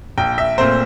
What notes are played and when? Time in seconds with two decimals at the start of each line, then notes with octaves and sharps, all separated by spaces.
0.18 A#1 G5
0.38 E5
0.58 A#2 A3 C4 C5